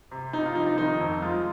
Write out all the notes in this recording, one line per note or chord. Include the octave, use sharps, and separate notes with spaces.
C3
C3 D#4
F4
F3 D#4
D#4
D#3 D#4
F2
G#3 F4